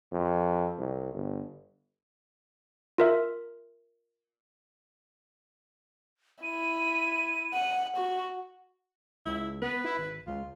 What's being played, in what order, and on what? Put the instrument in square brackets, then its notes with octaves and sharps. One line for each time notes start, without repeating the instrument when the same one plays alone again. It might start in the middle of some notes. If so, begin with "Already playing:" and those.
[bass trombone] F2
C2
G1
[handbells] F4 A#4 E5
[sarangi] E4 [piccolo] D#7
[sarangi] F#5
F#4
[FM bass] C#2 [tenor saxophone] E4
[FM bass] B3 [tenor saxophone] B4
[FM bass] E4
G#1
[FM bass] C#2 [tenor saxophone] F4